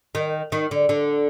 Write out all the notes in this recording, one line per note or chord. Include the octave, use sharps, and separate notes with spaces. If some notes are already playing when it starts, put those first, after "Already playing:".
D#3
D#3
D3
D3